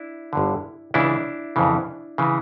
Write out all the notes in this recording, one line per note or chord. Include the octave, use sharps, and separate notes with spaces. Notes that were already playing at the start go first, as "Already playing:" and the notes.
Already playing: D4 E4
G1 G2 D3
C#2 C#3 E3 D4 E4
F2 C#3 E3
C#3 E3